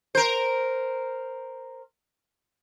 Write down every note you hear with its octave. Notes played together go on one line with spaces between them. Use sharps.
A#4 C5